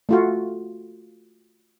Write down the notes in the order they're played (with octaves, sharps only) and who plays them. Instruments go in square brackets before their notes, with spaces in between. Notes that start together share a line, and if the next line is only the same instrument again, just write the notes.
[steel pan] A3 F4 F#4